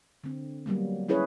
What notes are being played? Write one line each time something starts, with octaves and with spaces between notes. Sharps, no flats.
D3 C4
F#3 G3 A#3 B3
C#4 E4 G#4 B4 C#5